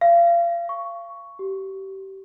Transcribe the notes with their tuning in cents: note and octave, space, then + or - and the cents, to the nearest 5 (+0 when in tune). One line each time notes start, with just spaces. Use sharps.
F5 -30
C#6 +10
G4 -25